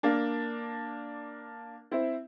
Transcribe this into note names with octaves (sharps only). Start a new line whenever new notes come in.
A#3 D4
C4 E4